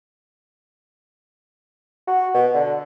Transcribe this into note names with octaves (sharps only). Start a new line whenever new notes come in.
F#4
B2
D3